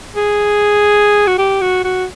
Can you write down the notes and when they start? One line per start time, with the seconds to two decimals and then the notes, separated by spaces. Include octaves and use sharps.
0.15 G#4
1.27 F#4
1.38 G4
1.61 F#4
1.84 F#4